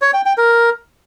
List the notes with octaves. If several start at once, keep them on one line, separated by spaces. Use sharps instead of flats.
C#5
G5
G5
A#4